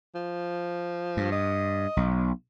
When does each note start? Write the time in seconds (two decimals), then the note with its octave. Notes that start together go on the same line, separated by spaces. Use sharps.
0.15 F3
1.17 G2
1.32 D#5
1.97 B1